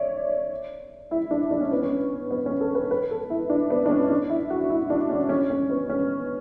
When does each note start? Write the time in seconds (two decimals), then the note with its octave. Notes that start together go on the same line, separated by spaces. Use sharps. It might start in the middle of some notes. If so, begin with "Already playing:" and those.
Already playing: C#5 D5 E5
1.11 E4
1.31 D4
1.51 D4
1.61 C#4
1.71 B3
1.82 C#4
2.31 B3
2.46 C#4
2.61 A4
2.75 B4
2.91 B4
3.11 A4
3.30 E4
3.50 D4
3.70 B3
3.86 D4
3.90 C#4
4.10 D4
4.30 E4
4.50 F#4
4.70 E4
4.90 D4
5.10 C#4
5.29 C#4
5.50 C#4
5.70 B3
5.89 C#4